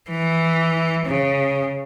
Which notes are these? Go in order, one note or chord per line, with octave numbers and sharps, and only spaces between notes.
E3
C#3